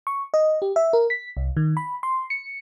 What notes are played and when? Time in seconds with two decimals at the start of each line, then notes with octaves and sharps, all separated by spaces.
0.07 C#6
0.34 D#5
0.62 G4
0.76 E5
0.93 A#4
1.10 B6
1.37 C2
1.57 D#3
1.77 B5
2.03 C6
2.30 C#7